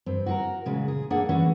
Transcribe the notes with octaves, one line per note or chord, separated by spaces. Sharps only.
G2 C4
F#4 G#4 A#4
A#2 C#3 G#3
G#4
A#3 D4 G#4 A4 F#5
E3 A3 C#4 D4 F#4